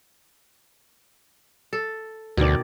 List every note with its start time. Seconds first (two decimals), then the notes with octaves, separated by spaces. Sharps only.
1.73 A4
2.37 D2 B2 D#3 D5